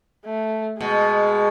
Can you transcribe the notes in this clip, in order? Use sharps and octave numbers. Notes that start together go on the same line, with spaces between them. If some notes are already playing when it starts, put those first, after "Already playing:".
A3
B2 G#3